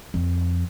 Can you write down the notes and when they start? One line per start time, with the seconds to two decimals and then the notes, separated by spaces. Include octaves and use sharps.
0.14 F2